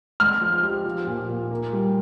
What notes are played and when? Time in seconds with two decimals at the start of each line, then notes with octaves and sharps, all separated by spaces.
0.20 G#3 F6
0.41 F3
0.63 G4
0.86 F3
1.07 A#2
1.29 A#2
1.51 A#3
1.73 G3